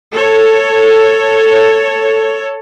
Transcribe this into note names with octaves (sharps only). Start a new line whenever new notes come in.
A4 C#5